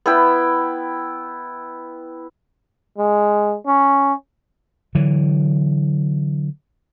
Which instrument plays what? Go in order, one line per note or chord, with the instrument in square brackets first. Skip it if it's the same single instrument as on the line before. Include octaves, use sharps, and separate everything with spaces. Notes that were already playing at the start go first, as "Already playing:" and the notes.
[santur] B3 E4 G5
[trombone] G#3
C#4
[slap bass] D3 E3 F#3